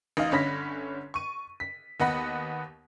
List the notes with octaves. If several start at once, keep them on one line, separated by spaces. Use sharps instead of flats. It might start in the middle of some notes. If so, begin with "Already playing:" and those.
A1 D#4 D#5 F5
G1 D3 C#4 B5 A#6 B6
C#6 D#7
B6
D#2 B3 D#5 F#5 B5 A#6